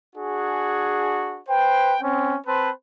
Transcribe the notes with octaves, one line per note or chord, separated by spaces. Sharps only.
D4 F#4 G#4
B4 C5 G5
C4 C#4
C4 B4 C5 A5